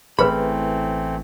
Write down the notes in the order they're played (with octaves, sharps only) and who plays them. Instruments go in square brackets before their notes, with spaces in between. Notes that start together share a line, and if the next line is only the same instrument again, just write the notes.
[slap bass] A1 [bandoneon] E3 A3 C4 [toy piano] G#4 B4 [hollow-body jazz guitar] B5